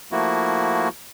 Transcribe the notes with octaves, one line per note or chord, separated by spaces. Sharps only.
F3 A3 A#3 E4 F#4